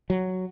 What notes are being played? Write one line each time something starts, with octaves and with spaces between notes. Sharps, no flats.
F#3